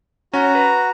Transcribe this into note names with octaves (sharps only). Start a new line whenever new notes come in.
C#4 F#4 A#5
B4